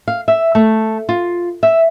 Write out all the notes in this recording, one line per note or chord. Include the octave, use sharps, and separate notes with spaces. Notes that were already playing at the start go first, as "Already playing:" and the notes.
F5
E5
A3
F4
E5